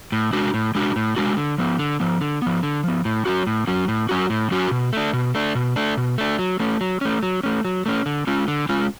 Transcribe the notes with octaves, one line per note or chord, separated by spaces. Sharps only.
A2
G#3 D4 F#4
A2
G#3 D4 F#4
A2
G#3 D4 F#4
D3
F3 B3
D3
F3 B3
D3
F3 B3
D3
F3 B3
A2
F#3 C#4 F#4
A2
F#3 C#4 F#4
A2
F#3 C#4 F#4
A2
F#3 C#4 F#4
B2
A3 D4
B2
A3 D4
B2
A3 D4
B2
A3 D4
F#3
A3 C#4
F#3
A3 C#4
F#3
A3 C#4
F#3
A3 C#4
D3
G#3 C#4 F4
D3
G#3 C#4 F4